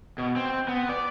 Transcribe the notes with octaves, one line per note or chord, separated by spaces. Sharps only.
B2
C4
B3
D5